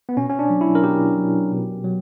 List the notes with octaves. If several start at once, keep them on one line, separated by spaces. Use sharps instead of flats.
B3
B2 C#4
C#4
D4
F#3
E4
A#4
B2 G4
F#3
B2
F#3